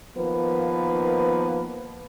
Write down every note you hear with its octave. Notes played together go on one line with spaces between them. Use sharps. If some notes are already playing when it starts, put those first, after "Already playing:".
D#3 F3 A#3 B3 B4